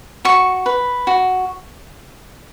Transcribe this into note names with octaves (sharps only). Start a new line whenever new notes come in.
F#4 C#6
B4
F#4